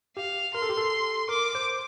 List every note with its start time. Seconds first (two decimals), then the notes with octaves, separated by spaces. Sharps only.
0.17 G4 F5
0.54 A#4 C6
0.62 A4
0.69 G4
0.77 A4
1.29 A#4 D6
1.55 C5